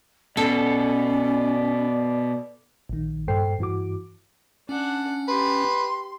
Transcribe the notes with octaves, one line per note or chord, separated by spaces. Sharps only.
B2 C#4 A4 D5
A#1 D#3
G2 A#2 A4 C5 G5 C7
G2 E3 F#4 D6
C#4 D4 F#5
G4 B4 C6